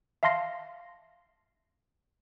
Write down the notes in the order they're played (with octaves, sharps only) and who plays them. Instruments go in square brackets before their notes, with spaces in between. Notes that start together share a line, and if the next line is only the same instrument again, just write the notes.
[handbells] E5 F5 A5 C6 A#6 C7